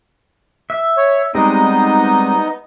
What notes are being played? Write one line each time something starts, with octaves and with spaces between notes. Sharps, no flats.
E5
C#5
G3 G#3 B3 C4 D#4 D#5